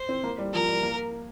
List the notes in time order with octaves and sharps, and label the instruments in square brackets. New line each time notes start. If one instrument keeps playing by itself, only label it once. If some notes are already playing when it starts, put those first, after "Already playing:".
Already playing: [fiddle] C5
[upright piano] C4
A#3
G3
[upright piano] F3 [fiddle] A#4
[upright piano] G3
A#3